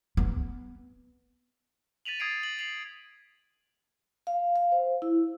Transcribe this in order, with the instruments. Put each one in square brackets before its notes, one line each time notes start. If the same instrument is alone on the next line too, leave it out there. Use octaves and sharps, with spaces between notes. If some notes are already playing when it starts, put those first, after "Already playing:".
[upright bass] B3
[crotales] A6 B6 D#7 F7 F#7
D#6 G#6 A6 C7 D7
F#7
C7 F7 F#7
[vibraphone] F5
F5
C5
E4